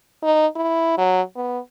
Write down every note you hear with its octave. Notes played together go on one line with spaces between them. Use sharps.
D#4
E4
F#3
B3